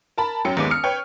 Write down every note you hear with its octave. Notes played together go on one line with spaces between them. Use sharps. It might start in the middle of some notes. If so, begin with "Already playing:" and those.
A#4 A5 B5
F#2 F#3 G5 C#7
D#2 G#3 B3 D6
D#6 F6 C#7
B4 C#5 G5